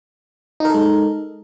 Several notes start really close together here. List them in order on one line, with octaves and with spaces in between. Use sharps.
D#4 A#4 A4 G#3